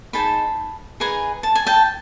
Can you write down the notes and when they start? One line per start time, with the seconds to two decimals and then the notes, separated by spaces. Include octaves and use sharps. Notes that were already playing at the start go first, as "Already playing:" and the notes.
0.13 D#4 G#4 C5 A5 B5
1.00 D#4 G#4 B4 G#5 A#5
1.43 A5
1.55 G#5
1.67 G5 A5